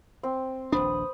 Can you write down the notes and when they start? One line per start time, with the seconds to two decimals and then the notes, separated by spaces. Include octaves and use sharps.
0.23 C4
0.72 D#1 A#1 D4 B4 C5 D#6